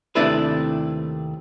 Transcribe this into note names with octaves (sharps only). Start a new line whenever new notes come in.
D#2 C3 A3 D4 E4 B4